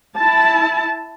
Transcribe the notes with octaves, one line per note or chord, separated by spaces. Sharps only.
E4 A5